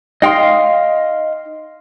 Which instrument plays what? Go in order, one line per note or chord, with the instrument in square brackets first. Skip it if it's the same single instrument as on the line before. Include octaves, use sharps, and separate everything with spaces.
[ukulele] D#4 G5 [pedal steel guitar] D#5 F5 C6